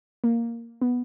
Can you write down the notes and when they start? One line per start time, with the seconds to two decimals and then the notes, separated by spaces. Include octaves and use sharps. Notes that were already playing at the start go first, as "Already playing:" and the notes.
0.24 A#3
0.81 B3